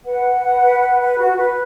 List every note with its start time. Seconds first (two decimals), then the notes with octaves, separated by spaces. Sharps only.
0.05 B4 F#5
0.24 B4
0.42 B4
0.62 B4
0.80 B4
1.00 B4
1.18 F#4
1.36 B4